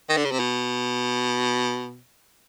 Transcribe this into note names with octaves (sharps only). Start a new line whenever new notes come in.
D#3
D3
C#3
C3
B2